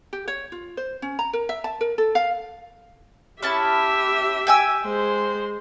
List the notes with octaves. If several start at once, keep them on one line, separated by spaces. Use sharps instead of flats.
G4
C#5
F4
C5
C#4
A#5
A#4
E5
A5
A#4
A4
F5
C#4 E4 G4 E5 A5
G5 G#5 E6
G#3 C5